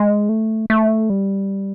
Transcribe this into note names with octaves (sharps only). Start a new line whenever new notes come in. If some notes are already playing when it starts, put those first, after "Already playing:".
Already playing: G#3
A3
A3
G3